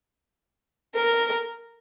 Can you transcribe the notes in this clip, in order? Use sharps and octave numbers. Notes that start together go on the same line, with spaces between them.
A#4